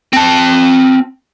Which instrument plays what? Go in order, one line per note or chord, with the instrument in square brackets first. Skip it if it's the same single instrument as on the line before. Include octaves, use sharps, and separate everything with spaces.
[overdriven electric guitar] C4 A5